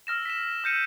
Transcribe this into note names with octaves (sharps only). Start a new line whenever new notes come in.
E6 F6 A#6 E7
B6 E7
E6 F6 G6 A#6 C#7 D#7